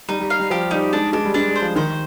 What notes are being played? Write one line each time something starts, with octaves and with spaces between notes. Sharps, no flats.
G3 D#4
G3
F5
G3
F3 G4
G3 D#4
G#3 D4
G#3 D4
G3
G#3 D4
G3
C5
F3
D#3 C5